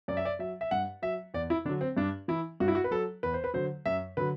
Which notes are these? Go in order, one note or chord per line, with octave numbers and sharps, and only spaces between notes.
F#2 D5
E5
D5
F#3 E5
E5
G2 F#5
F#3 E5
E2 D5
E4
D3 F#3 D4
C4
G2 D4
E3 E4
G2 F#4
E4
F#4
B4
F#3 A4
E2 B4
C5
B4
D3 F#3 C5
F#2 E5
D3 F#3 B4